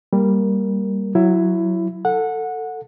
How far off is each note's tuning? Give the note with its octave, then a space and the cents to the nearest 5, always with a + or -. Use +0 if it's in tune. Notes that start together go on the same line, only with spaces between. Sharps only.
G3 +0 A#3 +0 A#4 +0
F#3 +0 E4 +15
A4 +20 F#5 -15